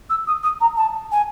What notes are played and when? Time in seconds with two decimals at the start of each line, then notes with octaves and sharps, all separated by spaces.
0.10 E6
0.27 D#6
0.43 D#6
0.60 A#5
0.77 A5
1.11 G#5